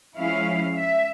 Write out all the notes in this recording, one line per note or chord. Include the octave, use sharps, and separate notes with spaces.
F3 G#3 C#4 E4 F5
E5